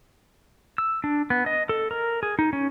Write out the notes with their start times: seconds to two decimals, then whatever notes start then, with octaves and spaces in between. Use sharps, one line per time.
0.78 E6
1.04 D4
1.30 B3
1.46 D#5
1.69 A4
1.91 A#4
2.23 G#4
2.39 D#4
2.53 C#4